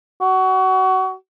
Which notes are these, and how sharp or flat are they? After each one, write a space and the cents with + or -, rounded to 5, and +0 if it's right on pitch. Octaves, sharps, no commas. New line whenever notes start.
F#4 +25